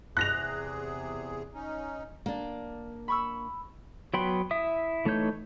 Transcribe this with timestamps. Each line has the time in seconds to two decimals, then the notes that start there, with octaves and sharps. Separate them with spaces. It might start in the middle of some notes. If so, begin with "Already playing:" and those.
0.17 E2 C3 G#4 F#6 A#6 F7
1.54 C#4 D#4
2.26 A#3 D4
3.08 B5 C#6 E6
4.14 F#3 B3 G5 B5 C6
4.51 E4 E5 D#6
5.05 E3 A3 D#4 C#5 G6